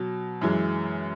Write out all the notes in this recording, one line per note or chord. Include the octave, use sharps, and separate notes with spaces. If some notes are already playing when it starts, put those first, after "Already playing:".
Already playing: B2 F#3
F#2 E3 G#3